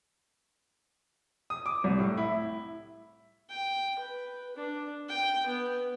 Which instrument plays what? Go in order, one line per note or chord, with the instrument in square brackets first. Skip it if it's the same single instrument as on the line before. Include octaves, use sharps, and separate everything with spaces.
[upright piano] D#6
D6
C2
A2
E4
[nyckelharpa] G5
B4
D4
G5
B3